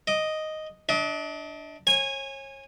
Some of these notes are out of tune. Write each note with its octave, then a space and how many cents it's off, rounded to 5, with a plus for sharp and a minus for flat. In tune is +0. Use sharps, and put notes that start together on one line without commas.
D#5 +0 D6 +25
D4 +0 D#5 +40
C#5 -30 G#5 -15